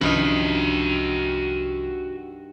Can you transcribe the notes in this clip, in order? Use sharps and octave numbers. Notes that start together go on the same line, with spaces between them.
C2 G2 D#3 F3 C#4 F#4 D#5 E5